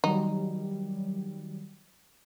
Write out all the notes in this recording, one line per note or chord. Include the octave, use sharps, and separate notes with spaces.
D#3 F#3 G3 D#4